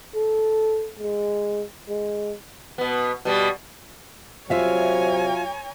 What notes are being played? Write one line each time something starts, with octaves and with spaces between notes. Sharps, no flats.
A4
G#3
G#3
B2 B3
B2 G3
C3 F#3 F4 C#5 E5 F5 G#5 A#5